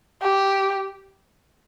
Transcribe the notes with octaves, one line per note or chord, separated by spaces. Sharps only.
G4